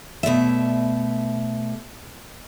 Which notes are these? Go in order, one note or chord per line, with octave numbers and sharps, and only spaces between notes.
B2 A3 D5 E5